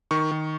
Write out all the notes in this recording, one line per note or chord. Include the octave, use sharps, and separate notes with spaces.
D#3 C#6
D#3